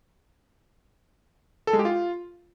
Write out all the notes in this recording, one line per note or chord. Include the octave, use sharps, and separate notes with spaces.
A4
G#3
G4
F4